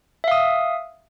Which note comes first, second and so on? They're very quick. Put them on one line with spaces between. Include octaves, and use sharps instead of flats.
E5 F5 D#6